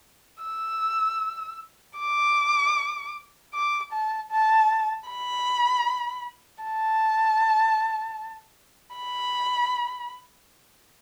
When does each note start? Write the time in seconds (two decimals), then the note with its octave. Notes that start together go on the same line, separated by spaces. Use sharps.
0.43 E6
1.99 D6
3.54 D6
3.92 A5
4.31 A5
5.09 B5
6.63 A5
8.96 B5